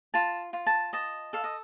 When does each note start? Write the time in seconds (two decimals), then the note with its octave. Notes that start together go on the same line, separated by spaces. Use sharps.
0.14 F4 A5
0.53 F4
0.66 A5
0.93 D#5 A5
1.33 A4 F5
1.44 D#5